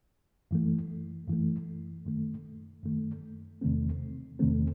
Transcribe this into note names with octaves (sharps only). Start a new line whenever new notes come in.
F#2 E3 A3
F#2 E3 A3
F#2 D#3 A3
F#2 D#3 A3
E2 C3 D#3 A3 C4
E2 C3 D#3 A3 C4